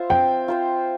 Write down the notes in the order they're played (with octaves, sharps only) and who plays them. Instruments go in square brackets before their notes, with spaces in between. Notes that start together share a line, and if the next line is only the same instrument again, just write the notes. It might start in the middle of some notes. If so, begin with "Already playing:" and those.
Already playing: [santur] F4 C5 E5
[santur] C4 [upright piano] G5
[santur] F4 C5 E5